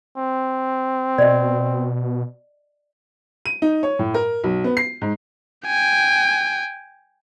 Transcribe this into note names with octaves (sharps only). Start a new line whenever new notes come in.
C4
B2 D5 D#5
D#7
D#4
C#5
A2
A#4
B1
B3
C7
G#2
G5 G#5